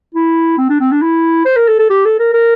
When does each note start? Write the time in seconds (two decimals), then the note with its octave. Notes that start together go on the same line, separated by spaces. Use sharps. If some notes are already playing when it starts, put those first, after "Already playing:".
0.14 E4
0.58 C4
0.70 D4
0.81 C4
0.92 D4
1.02 E4
1.45 C5
1.56 A#4
1.68 A4
1.79 A4
1.90 G4
2.05 A4
2.19 A#4
2.33 A#4